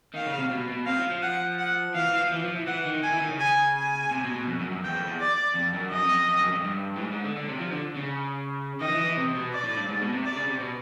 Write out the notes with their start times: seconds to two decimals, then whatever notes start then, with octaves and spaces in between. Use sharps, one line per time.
0.14 D#3 F5
0.27 C#3
0.38 C3
0.51 B2
0.68 B2
0.86 C3 F5
0.99 F3
1.11 F3
1.22 F#5
1.58 F#5
1.95 E3 F5
2.07 E3
2.19 F3
2.32 E3
2.43 F3
2.55 E3
2.66 E3 F#5
2.85 D#3
3.03 D#3 G#5
3.12 E3
3.21 D#3
3.30 C#3
3.40 G#5
3.75 G#5
4.11 C3
4.24 B2
4.36 B2
4.48 F2
4.60 F#2
4.72 F#2
4.84 E2 G5
4.95 F2
5.07 E2
5.20 D5
5.55 F2
5.74 F#2
5.91 F#2 D#5
6.04 F2
6.28 F2
6.40 F#2
6.52 F2
6.64 G2
6.96 A2
7.00 G#2
7.12 G#2
7.24 D3
7.36 D3
7.48 C3
7.60 F3
7.72 D3
7.96 C#3
8.80 D#3 D#5
8.88 F3
8.92 E3
9.04 E3
9.17 C3
9.35 B2
9.52 D5
9.64 A2
9.77 G2
9.89 G#2
10.01 B2
10.13 C3
10.25 D5
10.36 C#3
10.48 C3
10.60 B2